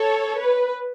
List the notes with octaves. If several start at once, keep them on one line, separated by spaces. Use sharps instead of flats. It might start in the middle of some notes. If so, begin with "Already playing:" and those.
Already playing: A4 C#5
B4